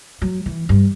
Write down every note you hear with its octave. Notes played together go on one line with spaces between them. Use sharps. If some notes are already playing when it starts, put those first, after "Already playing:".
F#3
E3
G2